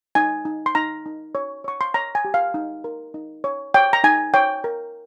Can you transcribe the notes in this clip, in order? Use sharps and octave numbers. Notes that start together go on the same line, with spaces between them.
D#4 G#5
D#4
C6
D#4 A#5
D#4
C#5
C#5 C#6
C6
C#5 A#5
G#5
G4
F5
D#4
A#4
D#4
C#5
C#5 G5
A#5
D#4 G#5
C#5 G5
A#4